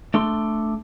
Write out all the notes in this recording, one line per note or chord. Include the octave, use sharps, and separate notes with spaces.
A3 D4 A4 C6